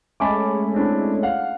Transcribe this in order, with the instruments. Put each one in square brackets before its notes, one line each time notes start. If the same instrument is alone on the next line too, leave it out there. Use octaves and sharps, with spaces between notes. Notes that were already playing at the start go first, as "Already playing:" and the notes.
[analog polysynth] G#3 A3 C#4 [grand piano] A5 B5 D6
[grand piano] C4 D4 E4
F5 F#5